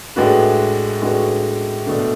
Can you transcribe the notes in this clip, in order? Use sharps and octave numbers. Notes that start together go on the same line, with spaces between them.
A2 G#3 D4 F#4 B4
A2 G#3 D4 F#4 B4
B2 A3 D4